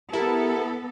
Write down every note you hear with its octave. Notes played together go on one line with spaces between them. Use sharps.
B3 E4 G4 A4 A#4